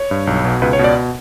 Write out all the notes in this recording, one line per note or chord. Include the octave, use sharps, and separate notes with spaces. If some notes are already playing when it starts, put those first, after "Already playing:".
Already playing: C#5
G2
B1
B2
C#2 B4
C#5
B2
D5